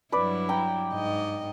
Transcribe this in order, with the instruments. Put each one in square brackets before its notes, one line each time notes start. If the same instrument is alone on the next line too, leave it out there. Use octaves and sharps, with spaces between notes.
[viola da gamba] G2 F#3 E4 [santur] B4 D5
[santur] G5 A#5
[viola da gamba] G#2 D#5